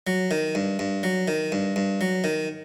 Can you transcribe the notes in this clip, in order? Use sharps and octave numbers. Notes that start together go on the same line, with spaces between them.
F#3
D#3
G2
G2
F#3
D#3
G2
G2
F#3
D#3